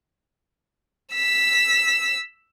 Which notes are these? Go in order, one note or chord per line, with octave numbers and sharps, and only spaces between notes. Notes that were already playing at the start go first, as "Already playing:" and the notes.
E6 B6